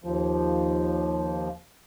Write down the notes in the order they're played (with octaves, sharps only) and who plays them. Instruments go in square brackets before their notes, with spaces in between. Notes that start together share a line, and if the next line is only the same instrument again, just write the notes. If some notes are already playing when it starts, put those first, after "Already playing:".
[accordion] D#2 F3